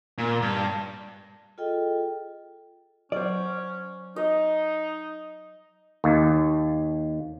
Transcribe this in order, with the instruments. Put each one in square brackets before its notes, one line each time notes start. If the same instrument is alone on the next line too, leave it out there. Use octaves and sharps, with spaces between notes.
[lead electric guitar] A#2
G2
[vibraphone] F4 G#4 A4 D#5 G5
[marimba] F#3 [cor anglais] C#4 [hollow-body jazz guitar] C5 D5
[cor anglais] D#4 [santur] D#5
[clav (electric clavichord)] D#2